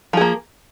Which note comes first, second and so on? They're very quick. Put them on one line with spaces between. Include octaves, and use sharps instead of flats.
F3 G#4 A#3